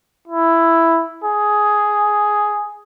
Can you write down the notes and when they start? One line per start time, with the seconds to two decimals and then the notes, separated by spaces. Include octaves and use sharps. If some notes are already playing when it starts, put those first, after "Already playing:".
0.28 E4
1.24 G#4